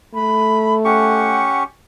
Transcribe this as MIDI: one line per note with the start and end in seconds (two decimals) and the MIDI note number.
0.14 1.52 57
0.14 0.74 83
0.85 1.64 61
0.85 1.64 67
0.85 1.62 78
0.85 1.64 85